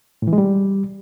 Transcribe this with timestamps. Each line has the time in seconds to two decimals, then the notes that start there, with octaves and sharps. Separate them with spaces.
0.22 A2
0.28 E3
0.33 G#3
0.38 G3